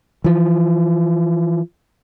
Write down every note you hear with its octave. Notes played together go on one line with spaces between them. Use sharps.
E3 F3